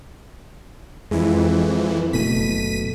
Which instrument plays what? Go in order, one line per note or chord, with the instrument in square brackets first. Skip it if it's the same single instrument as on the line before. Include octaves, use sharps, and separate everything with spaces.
[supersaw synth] F2 E3 [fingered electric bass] G#3
[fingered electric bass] F#1 B2 A3 [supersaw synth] B6 D#7